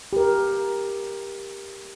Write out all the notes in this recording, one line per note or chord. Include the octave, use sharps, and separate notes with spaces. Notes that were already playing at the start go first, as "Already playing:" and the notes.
G4 A#4